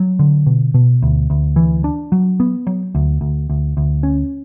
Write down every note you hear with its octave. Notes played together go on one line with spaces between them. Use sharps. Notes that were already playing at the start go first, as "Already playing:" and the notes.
Already playing: F#3
D3
B2
B2
D2
D2
E3
D4
F#3
B3
F#3
D2
D2
D2
D2
C#4